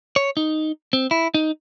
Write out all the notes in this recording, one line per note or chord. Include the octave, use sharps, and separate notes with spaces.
C#5
D#4
C4
E4
D#4